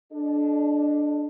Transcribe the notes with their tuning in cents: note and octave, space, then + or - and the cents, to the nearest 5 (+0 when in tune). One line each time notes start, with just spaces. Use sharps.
D4 +0 A4 -30 D#5 -25